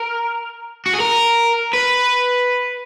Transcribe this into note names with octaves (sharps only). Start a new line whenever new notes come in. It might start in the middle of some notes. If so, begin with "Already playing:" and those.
Already playing: A#4
F#4
G#4
A#4
B4